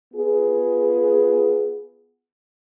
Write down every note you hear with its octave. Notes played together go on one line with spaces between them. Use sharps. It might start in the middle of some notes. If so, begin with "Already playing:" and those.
B3 F4 G#4